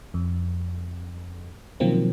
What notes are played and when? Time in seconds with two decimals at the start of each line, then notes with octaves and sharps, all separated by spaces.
0.14 F2
1.80 B2 D#3 F3 F#3 A#3 C4